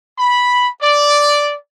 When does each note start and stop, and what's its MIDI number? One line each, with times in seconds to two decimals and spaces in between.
0.19 0.68 83
0.82 1.56 74